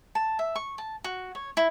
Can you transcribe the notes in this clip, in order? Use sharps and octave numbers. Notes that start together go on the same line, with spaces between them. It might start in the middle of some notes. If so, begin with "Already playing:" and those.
A5
E5
C#6
A5
F#4
C#5
E4